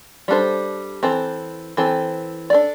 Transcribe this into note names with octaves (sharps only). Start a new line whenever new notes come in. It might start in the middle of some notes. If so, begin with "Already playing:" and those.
G3 D4 A4 C5
E3 C4 A4 C5
E3 C4 A4 C5
D4 A4 D5